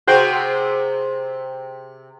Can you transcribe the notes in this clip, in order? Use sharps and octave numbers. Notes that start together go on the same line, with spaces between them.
C3 C4 F#4 G#4 C5 G5